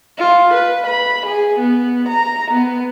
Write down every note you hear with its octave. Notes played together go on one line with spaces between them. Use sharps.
F4
B4
B5
G#4
B3
A#5
B3